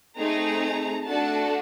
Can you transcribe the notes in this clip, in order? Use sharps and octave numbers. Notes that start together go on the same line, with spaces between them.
A3 C4 D#4 G#4 A#5
A3 D4 F#4 A4 A5